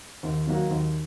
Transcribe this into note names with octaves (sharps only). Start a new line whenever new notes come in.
D#2
D#3 F#3 A#3 F#4
D#2